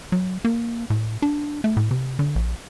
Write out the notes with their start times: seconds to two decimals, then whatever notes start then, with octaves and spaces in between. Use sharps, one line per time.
0.12 F#3
0.45 A#3
0.90 A2
1.22 D4
1.64 A3
1.77 A2
1.91 C3
2.19 D3
2.36 A#1